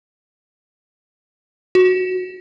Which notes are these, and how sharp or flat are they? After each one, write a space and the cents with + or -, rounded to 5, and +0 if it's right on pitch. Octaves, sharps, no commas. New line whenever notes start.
F#4 -10